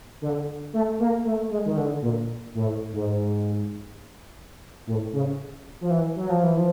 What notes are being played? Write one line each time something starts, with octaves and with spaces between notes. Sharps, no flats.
D3
A3
A#3
A3
G#3
D#3
D3
A#2
A2
G#2
A2
C#3
F3
E3
F#3
F3
E3
F3